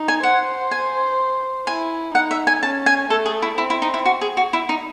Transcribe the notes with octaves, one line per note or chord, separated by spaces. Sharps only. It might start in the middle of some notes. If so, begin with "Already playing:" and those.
Already playing: D#4
G#5
C5 F#5
G#5
E4 G#5
D#4 F#5
E5
G#5
C#4 A5
G#5
A3 A4
G#4
E4
C4 E4
E4
D#4
E4
F#4
G#4
F#4
E4
D#4